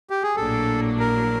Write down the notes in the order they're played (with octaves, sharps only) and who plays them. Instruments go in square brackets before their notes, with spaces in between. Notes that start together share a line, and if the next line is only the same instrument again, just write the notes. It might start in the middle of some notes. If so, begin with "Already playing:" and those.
[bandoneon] G4
G#4
[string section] A#1 A2 F#3 A#3 D4 [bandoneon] A4
[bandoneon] A#4